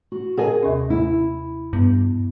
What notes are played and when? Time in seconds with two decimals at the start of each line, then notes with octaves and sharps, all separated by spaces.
0.12 F#4
0.38 G#4 A#4 D#5 F#5 G#5
0.63 D#2 C3 C#4
0.90 E4
1.73 G2 B3